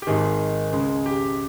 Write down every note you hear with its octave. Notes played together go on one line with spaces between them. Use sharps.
G4
G#1 G#2 D#3 G#4
C#2 C#3 G#3
G4